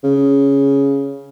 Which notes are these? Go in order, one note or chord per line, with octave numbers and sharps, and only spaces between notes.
C#3